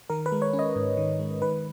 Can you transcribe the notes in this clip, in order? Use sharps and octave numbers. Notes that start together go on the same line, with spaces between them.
D#3 A#4
B4
G#3
C#5
C#4
D#5
G#2
D#3
G#3
D#3 B4